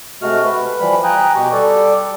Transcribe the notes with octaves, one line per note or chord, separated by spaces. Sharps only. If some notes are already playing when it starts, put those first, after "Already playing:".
C3 G#3 A3 F#4 F6
B4
E3 F3 G3 B5
G5 G#5 A#5 D#6 F#6
B2 G4 C#6
G3 A4 D5